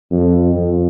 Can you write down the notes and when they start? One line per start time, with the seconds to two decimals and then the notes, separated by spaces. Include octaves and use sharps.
0.12 F2
0.56 F2